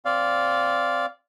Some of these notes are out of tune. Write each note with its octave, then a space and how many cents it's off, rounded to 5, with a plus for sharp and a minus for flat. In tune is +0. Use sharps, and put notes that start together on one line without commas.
C4 +0 D5 -15 F5 +0